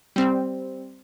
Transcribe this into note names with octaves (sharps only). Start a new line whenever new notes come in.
G3 C4